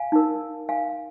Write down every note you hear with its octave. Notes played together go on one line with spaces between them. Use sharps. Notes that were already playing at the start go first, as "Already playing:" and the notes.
Already playing: F5 G#5
D#4 A#4
F5 G#5